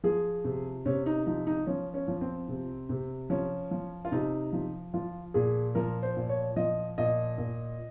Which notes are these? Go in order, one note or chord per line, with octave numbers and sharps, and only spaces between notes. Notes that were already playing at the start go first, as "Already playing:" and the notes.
F3 G#4
C3
C3 C#4
D#4
F3 D#4
D#4
F3 C#4
C#4
F3
C4
C3
C3
F3 C#4
F3
F4
C3 D#4
F3
F3 F4
A#2 G#4
F3 A#4
C5
A#2
C#5
F3 D#5
A#2 D#5
A#2